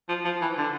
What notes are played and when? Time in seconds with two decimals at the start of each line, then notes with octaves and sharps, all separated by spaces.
0.09 F3
0.25 F3
0.41 E3
0.58 D3